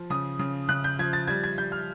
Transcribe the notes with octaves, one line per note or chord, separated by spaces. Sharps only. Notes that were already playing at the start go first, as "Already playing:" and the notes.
Already playing: F3
C#3 D#6
C#3
C#3 F#6
G6
F3 G#6
A6
G3 G#6
G#6
G3 G6
F6